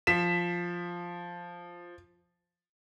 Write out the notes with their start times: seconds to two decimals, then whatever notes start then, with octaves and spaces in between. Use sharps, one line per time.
0.07 F3 B6 E7